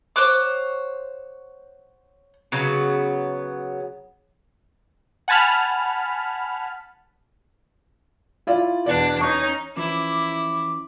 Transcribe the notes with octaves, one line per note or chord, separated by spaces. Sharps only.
C5 C#5 F#5 D6
C#3 F#3 B3
F#5 G#5 A5 B5 F6
E4 F4 D5
E2 B2 D4 D5
C#4 D#4 C#6
E3 F3 C#4 E4 D6